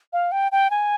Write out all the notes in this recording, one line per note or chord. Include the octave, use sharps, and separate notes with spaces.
F5
G5
G5
G#5